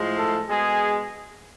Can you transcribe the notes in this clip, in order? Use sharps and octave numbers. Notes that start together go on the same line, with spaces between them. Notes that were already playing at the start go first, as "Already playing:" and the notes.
Already playing: A2 F3 G#3
A4
B2 G#3 G#4